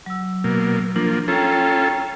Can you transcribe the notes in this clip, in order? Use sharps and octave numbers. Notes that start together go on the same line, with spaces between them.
F#3 E6
B2 A#3
F3 A#3 D4
C#4 F4 A4 G5 A#5